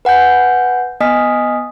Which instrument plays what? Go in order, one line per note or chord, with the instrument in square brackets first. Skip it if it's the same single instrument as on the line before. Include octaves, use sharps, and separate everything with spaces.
[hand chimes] B4 F#5 G#5 G6
B3 D#5 G#5 D#6 F6 B6